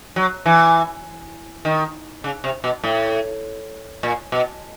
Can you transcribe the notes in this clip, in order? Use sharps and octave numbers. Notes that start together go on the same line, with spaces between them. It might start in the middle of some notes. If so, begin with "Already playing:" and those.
F#3
E3
D#3
C#3
C3
B2
A2
A#2
B2